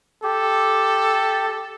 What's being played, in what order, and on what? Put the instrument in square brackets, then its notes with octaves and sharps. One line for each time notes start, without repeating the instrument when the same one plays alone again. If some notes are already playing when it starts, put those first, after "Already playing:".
[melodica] G4 [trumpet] A4